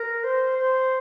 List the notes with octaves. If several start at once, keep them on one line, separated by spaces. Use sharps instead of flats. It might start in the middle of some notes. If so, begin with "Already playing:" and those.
Already playing: A#4
C5
C5